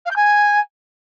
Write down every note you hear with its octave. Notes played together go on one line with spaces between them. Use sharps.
F5
G6
G#5